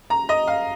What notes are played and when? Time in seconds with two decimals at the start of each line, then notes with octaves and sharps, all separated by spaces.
0.10 A#5
0.29 D#5
0.47 F5